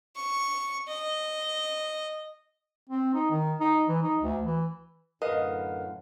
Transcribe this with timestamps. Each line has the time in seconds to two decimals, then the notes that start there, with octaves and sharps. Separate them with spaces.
0.16 C#6
0.88 D#5
2.89 C4
3.14 D#4
3.31 D#3
3.60 D#4
3.88 E3
4.03 D#4
4.22 D2
4.43 E3
5.22 F#2 A2 D3 A#4 B4 D#5 F5